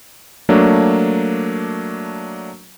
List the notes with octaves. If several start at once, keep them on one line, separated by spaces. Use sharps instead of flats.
F#3 A3 A#3 D4